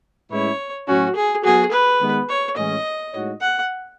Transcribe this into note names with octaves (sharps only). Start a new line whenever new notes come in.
A2 G#3 C#4 E4 B4 C#5
A2 F#3 C#4 F#4
G#4
F#3 B3 F#4 G#4
B4
D#3 G#3 B3
C#5
A2 E3 G#3 C#4 D#5
A2 G#3 D#4 F#4 C#5
F#5